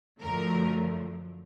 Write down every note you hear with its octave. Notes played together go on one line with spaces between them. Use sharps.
F#2 D3 F3 A3 A#4